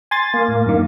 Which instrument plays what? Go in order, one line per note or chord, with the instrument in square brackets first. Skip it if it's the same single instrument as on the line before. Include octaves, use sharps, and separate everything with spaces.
[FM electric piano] G#5 C6 A6
[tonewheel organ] A#3
[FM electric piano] A2
F#2 D#3